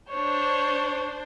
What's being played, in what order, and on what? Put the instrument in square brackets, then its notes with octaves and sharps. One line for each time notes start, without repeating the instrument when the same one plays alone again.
[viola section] D4 C5 [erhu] C#5